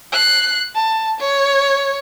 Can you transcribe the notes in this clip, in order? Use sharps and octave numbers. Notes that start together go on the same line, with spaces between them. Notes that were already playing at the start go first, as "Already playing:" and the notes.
F#6 C7
A5
C#5